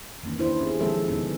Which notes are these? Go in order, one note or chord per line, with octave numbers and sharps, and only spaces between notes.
D#3 E3 A#3 C#4
D4 E4 C5
B3 C#4 G4 G#4
D#3 F3 G#3 C4 A4 E5
D3 B3 C#4 D#4